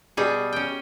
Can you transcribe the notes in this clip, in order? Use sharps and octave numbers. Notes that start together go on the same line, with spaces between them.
B2 G3 G#4
C#4 G5